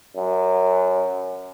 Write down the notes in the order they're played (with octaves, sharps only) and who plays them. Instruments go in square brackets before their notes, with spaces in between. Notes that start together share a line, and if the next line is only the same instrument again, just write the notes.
[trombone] F#2